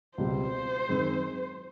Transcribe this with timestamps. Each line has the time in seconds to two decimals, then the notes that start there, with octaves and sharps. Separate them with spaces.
0.18 C#2 B2 G3 C4 C5
0.88 F#2 D#3 G#3 C4